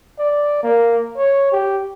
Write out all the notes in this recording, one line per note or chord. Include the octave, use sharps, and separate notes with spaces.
D5
A#3
C#5
G4